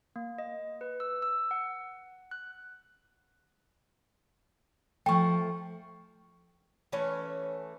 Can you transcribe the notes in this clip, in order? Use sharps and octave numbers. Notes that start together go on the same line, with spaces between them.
A#3
D#5
B4
E6
E6
F#5
F#6
F3 A3 G5 C#6
E3 A3 C#4